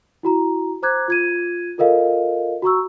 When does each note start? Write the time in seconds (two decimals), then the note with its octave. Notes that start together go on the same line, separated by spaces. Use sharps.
0.23 E4 F#4 A#5
0.82 C5 A#5 D6 F#6 G#6
1.08 F4 G#6 D#7
1.78 F4 A4 A#4 D#5 F5
2.62 F#4 A#5 C#6 E6